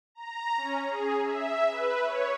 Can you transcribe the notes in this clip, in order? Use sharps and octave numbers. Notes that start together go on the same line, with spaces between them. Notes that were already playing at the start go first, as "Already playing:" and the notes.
A#5
C#4
G#4
E5
B4
C#5